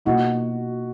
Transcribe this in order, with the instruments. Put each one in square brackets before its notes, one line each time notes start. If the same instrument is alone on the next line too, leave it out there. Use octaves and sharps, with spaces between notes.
[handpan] B2 A#3 F4 [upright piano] D#4 F#4